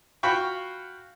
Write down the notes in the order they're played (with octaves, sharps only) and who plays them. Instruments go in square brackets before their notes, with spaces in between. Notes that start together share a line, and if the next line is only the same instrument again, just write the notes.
[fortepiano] F4 F#4 F5 G5 B5 C#6